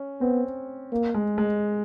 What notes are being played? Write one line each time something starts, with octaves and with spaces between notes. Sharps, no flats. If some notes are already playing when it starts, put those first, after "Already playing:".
Already playing: C#4
B3 C4
A#3
G#3
G#3